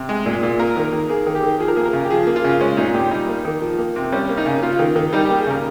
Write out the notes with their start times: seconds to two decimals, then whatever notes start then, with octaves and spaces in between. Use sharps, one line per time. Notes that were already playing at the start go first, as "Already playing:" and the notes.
Already playing: C3
0.09 G#3
0.26 A#2
0.43 A#2
0.59 A#3 A#4
0.77 D#3
0.85 A#4
0.93 D#3
1.09 A#3 G#4
1.27 D#3
1.35 G4
1.44 D#3
1.60 F3 G#4
1.68 A#4
1.76 A#3 G#4
1.85 A#4
1.93 C#3
2.05 G4
2.10 F3 G#4
2.27 A#3
2.36 F4
2.44 C#3
2.61 G#3 C#4
2.77 A#2 D#4
2.94 A#2 G4
3.11 G3 D#4
3.28 A#3
3.45 D#3
3.62 F3
3.79 A#3
3.96 C3
4.12 G3 C#4
4.29 A#3
4.37 D#4
4.46 C#3
4.63 A#3 F4
4.79 D#3
4.96 D#3
5.13 G3 D#4
5.25 G4
5.30 A#3
5.38 G#4
5.47 C#3 A#4